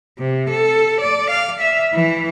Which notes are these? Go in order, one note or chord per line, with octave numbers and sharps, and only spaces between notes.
C3
A4
D5
F5
E5
E3